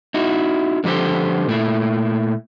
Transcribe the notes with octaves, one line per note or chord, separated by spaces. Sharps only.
D#4 E4 F#4
D3 F3 G4 A4 C5
A#2 A3 E4